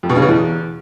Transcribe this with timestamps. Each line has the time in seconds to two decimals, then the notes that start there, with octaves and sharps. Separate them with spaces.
0.03 F2
0.10 B2
0.16 C#3
0.22 B2
0.28 E2